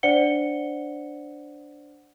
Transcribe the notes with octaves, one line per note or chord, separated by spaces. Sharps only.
D4 C5 D5 F#5 C#7 G7